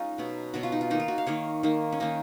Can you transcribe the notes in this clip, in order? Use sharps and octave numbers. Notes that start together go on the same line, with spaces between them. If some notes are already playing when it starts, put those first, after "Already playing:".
Already playing: G#3 C#4 D#4 F4
B2 F#3 B3
B2 F#3 B3 F#4
F4
D#4
F4
D#3 A#3 D#4
F4
F#4
F5
D#3 A#3 C#5
D#3 A#3
C#4
D#3 A#3 D#4